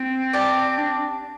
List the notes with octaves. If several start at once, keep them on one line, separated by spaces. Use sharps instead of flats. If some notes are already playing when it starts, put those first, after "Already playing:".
Already playing: C4
G4 D5 A5
D4